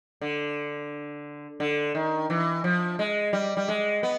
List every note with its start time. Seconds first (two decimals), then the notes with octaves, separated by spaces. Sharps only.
0.21 D3
1.60 D3
1.95 D#3
2.30 E3
2.64 F3
2.99 G#3
3.33 G3
3.57 G3
3.68 G#3
4.03 B3